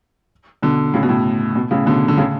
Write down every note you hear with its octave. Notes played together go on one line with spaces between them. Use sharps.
B2 D3
A2 C#3
B2
A2
B2
A2 C#3
B2 D3
D3
A2 C#3